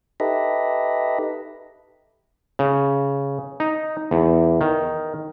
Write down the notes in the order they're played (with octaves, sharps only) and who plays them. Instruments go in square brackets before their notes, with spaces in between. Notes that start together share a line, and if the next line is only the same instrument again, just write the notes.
[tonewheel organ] D#4 G4 A4 B4 D#5 E5
[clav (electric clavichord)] C#3
D#4
E2
D#3